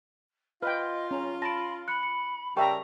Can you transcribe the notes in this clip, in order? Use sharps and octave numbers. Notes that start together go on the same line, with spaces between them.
F4 B4 D#5 G5 F6
C#4 A#5
A5 B5 A#6 D7
B5 F#6 C#7
C#7
C#3 G3 A#4 E5 G5 A5 A#5 C#6